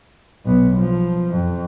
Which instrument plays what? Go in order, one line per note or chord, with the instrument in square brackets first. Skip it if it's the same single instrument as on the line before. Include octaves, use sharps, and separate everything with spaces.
[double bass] B1 B3
F3
F2